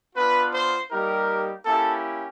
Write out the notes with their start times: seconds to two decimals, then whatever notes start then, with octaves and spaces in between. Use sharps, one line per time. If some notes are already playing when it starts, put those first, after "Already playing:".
0.16 B3 D4 F4 B4
0.53 C5
0.91 G3 A#3 D#4 G4 A#4
1.66 A#3 C#4 E4 G4 A4